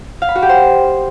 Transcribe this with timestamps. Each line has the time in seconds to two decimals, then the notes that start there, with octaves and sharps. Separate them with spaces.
0.22 F5
0.29 B5
0.35 F#4
0.42 G4
0.49 C5